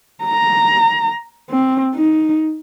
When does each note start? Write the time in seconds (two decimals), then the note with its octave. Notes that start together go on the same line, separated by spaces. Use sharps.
0.24 A#5
1.50 C4
1.95 D#4